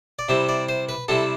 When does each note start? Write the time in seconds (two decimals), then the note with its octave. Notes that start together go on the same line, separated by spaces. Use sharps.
0.19 D5
0.29 C3 G3 C4 E4 E5
0.49 D5
0.69 C5
0.89 B4
1.08 C3 G3 C4 E4 A4